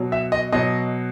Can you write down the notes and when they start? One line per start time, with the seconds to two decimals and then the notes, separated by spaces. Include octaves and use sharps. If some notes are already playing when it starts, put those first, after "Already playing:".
Already playing: B2 F#3
0.12 E5
0.32 D#5
0.52 B2 F#3 D#5